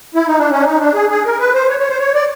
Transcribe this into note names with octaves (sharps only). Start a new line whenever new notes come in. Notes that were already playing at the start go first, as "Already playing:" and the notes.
E4
D#4
D4
C#4
D4
D#4
D4
G#4
G#4
A#4
B4
C5
C#5
C#5
C5
C#5
D5